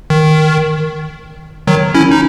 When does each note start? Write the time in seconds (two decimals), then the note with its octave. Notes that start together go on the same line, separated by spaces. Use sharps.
0.10 D#3
1.67 D#3 F#3
1.95 C#4 E4
2.11 D#4